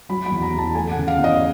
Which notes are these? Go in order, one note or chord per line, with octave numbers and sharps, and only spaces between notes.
F#3 B5
B5
E2
A#5
E2
A5
A3 G#5
F#5
C#3
F5
E2
D#5